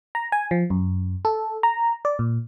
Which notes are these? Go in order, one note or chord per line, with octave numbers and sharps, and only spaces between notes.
A#5
G#5
F3
F#2
A4
A#5
D5
A#2